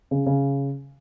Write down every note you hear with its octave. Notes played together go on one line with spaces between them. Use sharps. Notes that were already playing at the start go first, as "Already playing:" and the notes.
C#3
C#3